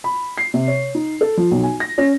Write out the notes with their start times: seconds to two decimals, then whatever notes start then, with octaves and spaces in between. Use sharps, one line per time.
0.04 B5
0.38 C7
0.54 C3
0.68 C#5
0.95 D#4
1.21 A4
1.37 F3
1.51 B1
1.63 G#5
1.80 A#6
1.98 C#4